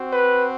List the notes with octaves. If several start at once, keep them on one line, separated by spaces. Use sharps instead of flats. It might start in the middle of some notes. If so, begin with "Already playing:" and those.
Already playing: C4 F#4
B4